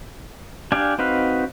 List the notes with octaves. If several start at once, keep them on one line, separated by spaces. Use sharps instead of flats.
D4 G4 D5 F5 G#5
C4 D#4 F#4 B4 F5